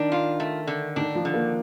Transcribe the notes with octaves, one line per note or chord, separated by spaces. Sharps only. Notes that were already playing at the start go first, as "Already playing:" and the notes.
Already playing: D#3 D4
F4
A3
D3
D#3 D4
F3
D3
A#3